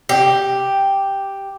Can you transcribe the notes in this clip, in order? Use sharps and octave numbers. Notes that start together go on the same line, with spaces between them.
G4